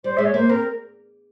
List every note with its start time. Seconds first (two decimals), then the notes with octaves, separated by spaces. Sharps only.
0.04 G3 C5
0.17 G#3 E5
0.25 C#5
0.34 A#3 C5
0.49 C4 A#4